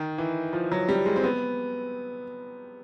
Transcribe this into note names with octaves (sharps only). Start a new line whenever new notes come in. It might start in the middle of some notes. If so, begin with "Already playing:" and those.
Already playing: D#3
E3
F3
F#3
G3
G#3
C4
B3